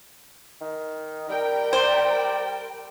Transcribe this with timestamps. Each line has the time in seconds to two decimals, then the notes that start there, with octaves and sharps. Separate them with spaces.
0.61 D#3
1.29 G3 A#4 G5
1.73 C5 D5